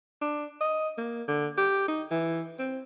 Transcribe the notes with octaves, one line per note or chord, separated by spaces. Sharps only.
D4
D#5
A#3
D3
G4
D#4
E3
C4